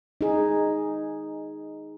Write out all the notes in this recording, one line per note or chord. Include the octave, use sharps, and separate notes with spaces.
D#4 G#4